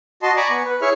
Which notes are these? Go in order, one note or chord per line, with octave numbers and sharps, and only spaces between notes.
F#4 D#5 A5 C6
D5 G#5 A#5 B5 C#6 D6
B3 G#5 C#6
B4
E4 G#4 C#5 E5 C#6 F6